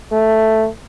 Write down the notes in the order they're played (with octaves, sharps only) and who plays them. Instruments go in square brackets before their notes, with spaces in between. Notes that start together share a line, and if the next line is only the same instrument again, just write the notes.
[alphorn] A3